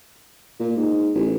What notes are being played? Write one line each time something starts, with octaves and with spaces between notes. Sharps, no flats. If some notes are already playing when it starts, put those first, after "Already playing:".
A#2
G#2
A1